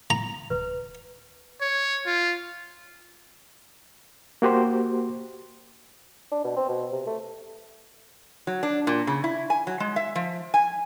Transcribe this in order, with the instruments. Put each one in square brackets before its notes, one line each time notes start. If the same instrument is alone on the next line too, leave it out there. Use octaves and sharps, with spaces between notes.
[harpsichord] A#5
[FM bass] D1 [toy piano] B4
[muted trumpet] C#5
F4
[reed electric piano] A#3 F#4 G4 C5
[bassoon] D4
B2
C4
B2
C3
A3
[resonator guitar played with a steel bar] F#3
D4
A#2
C#3
E4
G#5
F#3
G#3
E5
F3
G#5